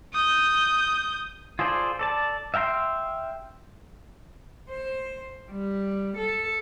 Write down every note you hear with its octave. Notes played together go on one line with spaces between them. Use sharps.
D#6 G6
F4 G#4 A4 C5 D5
A4 D5 A5
E5 F5 G5 A#5 C6
C5
G3
A4